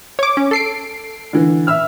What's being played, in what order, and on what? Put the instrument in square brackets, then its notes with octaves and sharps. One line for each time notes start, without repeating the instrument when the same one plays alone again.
[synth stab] C#5 D6
C#4
A4 C7 D7
[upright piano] D3 E3
E5 E6 F6